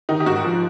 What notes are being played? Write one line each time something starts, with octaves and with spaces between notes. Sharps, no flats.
D#3 D#4
G4
G#2 F#4
F3